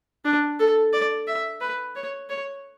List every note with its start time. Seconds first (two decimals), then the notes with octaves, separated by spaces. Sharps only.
0.25 D4
0.59 A4
0.93 D5
1.27 E5
1.61 B4
1.95 C#5
2.29 C#5